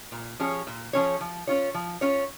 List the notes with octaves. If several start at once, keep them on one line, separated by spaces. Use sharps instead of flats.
A#2
F3 C#4 G#4 C#5
A#2
F3 C#4 G#4 C#5
F3
C#4 F4 C#5
F3
C#4 F4 C#5